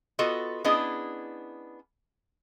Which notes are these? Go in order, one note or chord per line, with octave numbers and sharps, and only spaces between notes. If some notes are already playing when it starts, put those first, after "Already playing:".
B3 F4 F#4 A4 D#5
B3 C#4 D4 E4 G#4 D#5